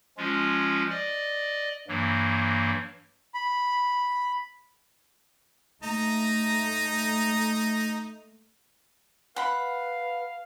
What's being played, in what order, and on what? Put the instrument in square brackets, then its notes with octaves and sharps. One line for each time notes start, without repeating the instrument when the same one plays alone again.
[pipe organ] F3 G#3 C#4 F4
D5 D#5
G2 E3 F#3 A#3
[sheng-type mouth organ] B5
[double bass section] A3 [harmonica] D#4 A#5
[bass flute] B4 [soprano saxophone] F5 [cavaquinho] F#5 B5